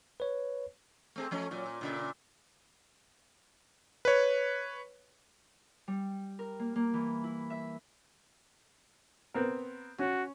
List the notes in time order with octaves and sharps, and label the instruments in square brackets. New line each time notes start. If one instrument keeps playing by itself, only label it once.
[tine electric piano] B4 C#5
[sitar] A3 C4 G#4
F3 A3 C#4
A#2 F#3
A#2
A#2 C#3 E5
[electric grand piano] B4 C#5
[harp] G3
A#4
A#3
A#3
E3
E4
E5
[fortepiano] B3 C4 A#4
[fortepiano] C#4 [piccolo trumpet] F#4